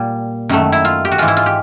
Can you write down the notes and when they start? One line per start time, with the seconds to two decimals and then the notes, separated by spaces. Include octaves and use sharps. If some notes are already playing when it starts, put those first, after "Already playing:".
Already playing: A#2 G3
0.49 F#2 D#3 F#3 A3
0.72 E4
0.85 F4
1.05 G4
1.12 F#4
1.18 G#2 E3 G#3 F4
1.28 E4
1.37 F4
1.46 G4